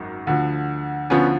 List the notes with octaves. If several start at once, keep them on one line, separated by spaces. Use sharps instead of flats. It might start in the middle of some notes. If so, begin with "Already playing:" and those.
Already playing: G#1 F#2 D#3
D2 D3 F3
D2 D3 F3 B3 C#4